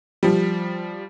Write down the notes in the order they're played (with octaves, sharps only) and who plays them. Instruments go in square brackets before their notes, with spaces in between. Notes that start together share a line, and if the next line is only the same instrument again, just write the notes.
[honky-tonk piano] F3 G3